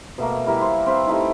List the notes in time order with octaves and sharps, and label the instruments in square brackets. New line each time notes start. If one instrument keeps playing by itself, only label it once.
[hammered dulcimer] B2 A3 A#3
G3 E4 A#4
C5
C4 B4 F5
G3 A3 D#4 E4